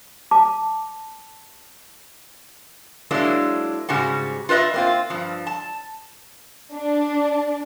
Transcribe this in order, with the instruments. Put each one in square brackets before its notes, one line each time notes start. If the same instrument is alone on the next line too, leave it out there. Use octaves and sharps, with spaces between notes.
[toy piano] A5 D6
[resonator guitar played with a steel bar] F#3 G#3 A#3 D4 E4
G#2 C#3 G3 F#4
F4 B4 C5 D#5 E5
A#3 C4 F4
G2 F3
A5
[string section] D4